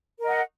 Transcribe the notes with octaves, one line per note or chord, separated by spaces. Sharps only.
A#4 D#5 F#5